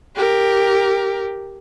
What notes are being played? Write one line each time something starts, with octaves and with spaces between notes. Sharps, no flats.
G4 A#4